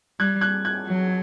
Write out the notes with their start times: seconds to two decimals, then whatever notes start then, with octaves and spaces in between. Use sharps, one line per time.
0.20 G3 F#6 G#6
0.41 F#6 G#6
0.65 F#6 G#6
0.87 F#3